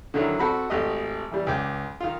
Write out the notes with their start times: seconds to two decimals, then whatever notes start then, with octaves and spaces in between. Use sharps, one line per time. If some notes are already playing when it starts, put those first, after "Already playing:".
0.14 D3 D#3 F#3 E4
0.39 C4 F#4 A4 A5 B5
0.70 G#1 A3 G4 D#5
1.31 E3 G3
1.47 C#2 G5 D6
2.01 D#3 F4